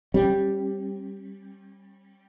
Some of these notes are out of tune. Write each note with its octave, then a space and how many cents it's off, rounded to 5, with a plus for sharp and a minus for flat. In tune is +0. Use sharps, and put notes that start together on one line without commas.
G3 +0 C#4 -35